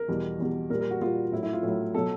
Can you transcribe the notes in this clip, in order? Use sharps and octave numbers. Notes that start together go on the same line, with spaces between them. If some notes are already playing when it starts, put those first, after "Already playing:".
Already playing: A#4
E2 B2 G3
E2 B2 G3
A#2 G3 A#4
A#4
F#4
A#2 G3 F4
A2 F#3 E4
E4
F4
A2 F#3
B2 F#3 A4